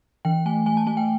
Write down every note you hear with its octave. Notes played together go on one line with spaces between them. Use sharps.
E3 G5
A3 G#5
A3 G#5
A5
A3 G#5
G5